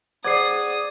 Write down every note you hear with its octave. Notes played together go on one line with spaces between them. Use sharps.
G#4 C5 D5 F#5 D#6 G#6 C7